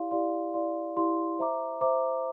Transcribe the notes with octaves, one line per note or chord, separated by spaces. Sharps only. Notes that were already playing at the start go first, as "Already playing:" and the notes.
Already playing: E4 G4 D5 F5 C6
E4 G4 D5 F5 C6
E4 G4 D5 F5 C6
E4 G4 D5 F5 C6
C5 E5 A#5 D6
C5 E5 A#5 D6